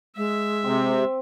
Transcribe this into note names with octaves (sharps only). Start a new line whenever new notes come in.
G#3 E5
C3 C4